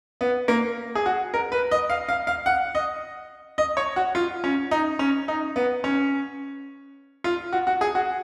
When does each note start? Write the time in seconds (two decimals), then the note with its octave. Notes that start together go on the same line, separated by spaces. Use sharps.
0.21 B3
0.48 A#3
0.95 G#4
1.06 F#4
1.34 A#4
1.52 B4
1.71 D#5
1.90 F5
2.09 F5
2.27 F5
2.46 F#5
2.75 D#5
3.58 D#5
3.77 C#5
3.96 F#4
4.15 F4
4.44 C#4
4.71 D#4
4.99 C#4
5.28 D#4
5.56 B3
5.84 C#4
7.24 F4
7.53 F#4
7.67 F#4
7.81 G#4
7.95 F#4